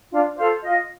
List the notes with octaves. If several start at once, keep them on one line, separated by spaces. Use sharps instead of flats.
D4 F4 F5
F4 A4 C5 F5
F4 D#5